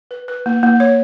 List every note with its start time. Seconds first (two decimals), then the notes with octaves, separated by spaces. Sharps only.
0.11 B4
0.28 B4
0.46 A#3
0.63 A#3
0.80 C#5